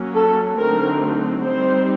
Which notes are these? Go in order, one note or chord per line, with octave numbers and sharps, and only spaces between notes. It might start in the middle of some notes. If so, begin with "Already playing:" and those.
Already playing: F#3 A#3 C#4
A4
D3 F#3 A3 C4 D#4 A#4
G3 C4 D#4 C5